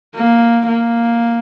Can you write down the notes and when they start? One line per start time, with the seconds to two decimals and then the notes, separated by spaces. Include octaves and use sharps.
0.15 A#3
0.68 A#3